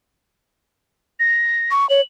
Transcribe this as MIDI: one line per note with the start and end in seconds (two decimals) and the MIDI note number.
1.20 1.71 94
1.71 1.88 85
1.90 2.01 73
1.90 2.03 102